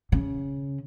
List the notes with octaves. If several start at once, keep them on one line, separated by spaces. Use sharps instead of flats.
C#3